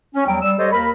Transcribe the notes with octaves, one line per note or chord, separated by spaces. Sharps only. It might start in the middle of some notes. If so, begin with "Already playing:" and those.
C#4
E2 F#3 G3 G5
G3 E6
G3 G4 A4 C5 C#5 D#5
D#2 A#4 B5